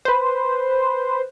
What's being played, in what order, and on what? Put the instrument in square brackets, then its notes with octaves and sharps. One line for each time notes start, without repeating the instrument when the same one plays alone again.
[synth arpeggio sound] B4 C5